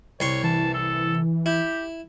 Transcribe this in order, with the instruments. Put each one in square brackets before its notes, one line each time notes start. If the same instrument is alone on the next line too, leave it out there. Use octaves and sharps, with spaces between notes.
[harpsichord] C2 C6 C#6 [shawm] C#5
[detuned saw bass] E3 [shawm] A5
[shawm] A4
[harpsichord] E4 [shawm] G4